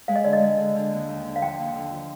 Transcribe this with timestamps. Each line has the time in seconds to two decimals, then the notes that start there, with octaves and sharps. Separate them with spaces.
0.08 G#3 F5
0.16 D#5
0.24 D3 D5
0.33 D#5
0.41 G#3
0.58 D3
0.75 D3
0.91 D#2
1.08 D#2
1.25 D3
1.36 F5
1.42 F3 G5
1.59 D#2
1.75 D3
1.93 F3